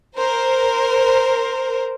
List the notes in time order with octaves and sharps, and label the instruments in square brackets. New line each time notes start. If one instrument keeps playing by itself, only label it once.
[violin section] A#4 C5